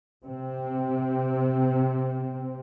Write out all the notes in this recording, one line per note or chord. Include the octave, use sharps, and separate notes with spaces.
C3 C4